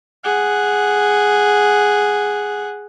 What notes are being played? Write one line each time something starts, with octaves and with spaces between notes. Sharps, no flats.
G#4 F#5